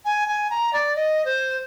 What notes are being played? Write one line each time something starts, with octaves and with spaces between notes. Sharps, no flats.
G#5
G#5
A#5
D5
D#5
C5